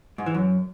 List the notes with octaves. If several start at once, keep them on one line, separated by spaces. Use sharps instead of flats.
G#2
E3
F#2